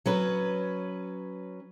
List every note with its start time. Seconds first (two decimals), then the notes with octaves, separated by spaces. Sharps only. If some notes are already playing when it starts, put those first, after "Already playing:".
0.06 F#3 C#4 B4